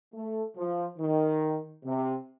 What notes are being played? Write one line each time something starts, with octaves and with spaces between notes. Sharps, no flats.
A3
F3
D#3
C3